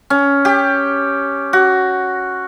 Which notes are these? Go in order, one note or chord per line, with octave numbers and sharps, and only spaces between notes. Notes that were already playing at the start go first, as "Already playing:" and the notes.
C#4
G4
F#4